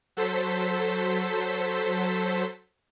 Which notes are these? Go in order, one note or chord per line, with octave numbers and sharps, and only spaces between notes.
F#3 A4 C5 B6